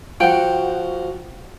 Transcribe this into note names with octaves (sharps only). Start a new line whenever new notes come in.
F3 F#4 F#5 G5